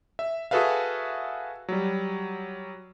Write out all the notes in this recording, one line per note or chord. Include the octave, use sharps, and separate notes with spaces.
E5
F#4 G#4 A4 B4 E5 F5
F#3 G3